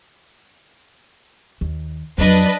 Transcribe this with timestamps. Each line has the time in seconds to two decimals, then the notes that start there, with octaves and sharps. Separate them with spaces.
1.61 D#2
2.18 F2 F#3 D4 B4 D#5